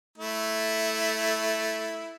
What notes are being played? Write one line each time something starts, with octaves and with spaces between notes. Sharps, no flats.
A3 E4